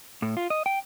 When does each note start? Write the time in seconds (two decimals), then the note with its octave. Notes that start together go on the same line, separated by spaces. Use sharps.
0.22 A2
0.37 F4
0.50 D#5
0.66 G5